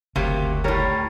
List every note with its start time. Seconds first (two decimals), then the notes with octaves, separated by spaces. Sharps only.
0.16 F#1 D2 C3 F#3 A#3
0.64 A2 G3 A#4 C#5